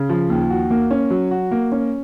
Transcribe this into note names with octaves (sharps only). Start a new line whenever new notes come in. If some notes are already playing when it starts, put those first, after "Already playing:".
Already playing: C#3
F3
D#2
F#4
A#3
C#4
F#3
F#4
A#3
C#4